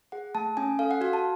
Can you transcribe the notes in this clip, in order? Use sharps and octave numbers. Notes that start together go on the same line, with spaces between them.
G#4 F#5
A3 A5
C#4 G#5
A4 F5
F#5
F#4 F5
A5